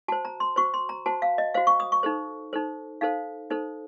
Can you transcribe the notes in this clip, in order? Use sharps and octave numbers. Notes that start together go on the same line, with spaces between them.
F#4 C5 A5
A#5
C6
F#4 C5 C#6
C6
A#5
F#4 C5 A5
F5
D#5
F#4 C5 F5
C#6
D#6
C#6
D#4 A4 C5
D#4 A4 C5
D#4 A4 C5 F5
D#4 A4 C5